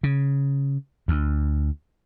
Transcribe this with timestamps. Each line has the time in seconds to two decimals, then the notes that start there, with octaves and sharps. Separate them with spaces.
0.03 C#3
1.08 D2